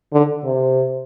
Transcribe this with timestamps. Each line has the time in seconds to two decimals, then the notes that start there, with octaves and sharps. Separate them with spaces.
0.13 D3
0.44 C3